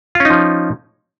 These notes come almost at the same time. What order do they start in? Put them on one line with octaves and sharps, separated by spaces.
F4 C#4 D#4 F3